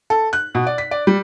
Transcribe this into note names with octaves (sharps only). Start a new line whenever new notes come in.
A4
F#6
B2
D5
B6
D5
G3